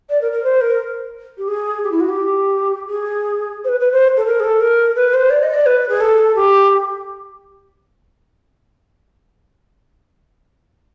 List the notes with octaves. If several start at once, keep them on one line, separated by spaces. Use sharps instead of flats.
D5
A#4
A#4
C5
A#4
G4
G#4
G4
E4
F#4
G4
G#4
C5
B4
B4
C5
A4
A#4
G#4
A4
A#4
B4
C5
D5
D#5
D5
B4
G#4
A4
G4